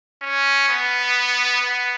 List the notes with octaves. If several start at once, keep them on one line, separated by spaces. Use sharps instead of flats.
C#4
B3
B3